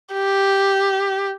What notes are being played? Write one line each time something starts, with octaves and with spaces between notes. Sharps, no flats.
G4